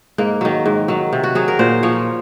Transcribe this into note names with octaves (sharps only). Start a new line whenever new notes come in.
G#2 A#3
D#3 F#3
G#2
D#3 F#3
C3
F#4
F#3 G#4
A#4
A#2 C5
F3 C#5